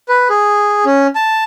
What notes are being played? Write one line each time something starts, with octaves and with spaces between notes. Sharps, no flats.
B4
G#4
C#4
A5